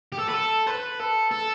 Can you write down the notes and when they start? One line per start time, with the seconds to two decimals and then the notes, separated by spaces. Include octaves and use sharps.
0.12 G4
0.19 A4
0.29 B4
0.34 A4
0.67 B4
1.00 A4
1.31 A4